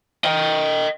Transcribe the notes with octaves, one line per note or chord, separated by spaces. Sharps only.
D#5 G5